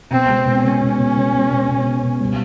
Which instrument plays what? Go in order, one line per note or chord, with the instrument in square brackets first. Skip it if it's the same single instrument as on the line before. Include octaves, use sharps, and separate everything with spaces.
[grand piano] B2 [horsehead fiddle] C4
[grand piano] G#3
B2
[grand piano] G#3 [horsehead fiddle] C#4
[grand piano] B2
B2
G#3
G#3
B2
B2
C4
B2
G3